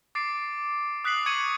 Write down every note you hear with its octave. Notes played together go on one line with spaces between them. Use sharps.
D6 A6 C7 D7
D#6 F#6 B6 C7 F#7
C#6 G#6 C#7 D#7 F#7